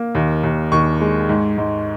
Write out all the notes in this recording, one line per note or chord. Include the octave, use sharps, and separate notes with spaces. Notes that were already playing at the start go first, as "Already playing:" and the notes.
Already playing: A#3
D#2
D#2
D#2 C#6
G#3
G#2
G#2